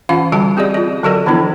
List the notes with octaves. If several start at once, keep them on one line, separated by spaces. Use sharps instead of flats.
E3 C#4 F4 F5 F#5
D3 G3 F#4 G#5 A5
C4 G4 G#4 D5 D#5
F4 D#5
D3 F#3 F#4 A4 A#4 D#5
D3 E3 F3 B3 D4 E4